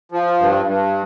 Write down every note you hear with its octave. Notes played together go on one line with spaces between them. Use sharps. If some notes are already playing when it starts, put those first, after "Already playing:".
F3
G2
G2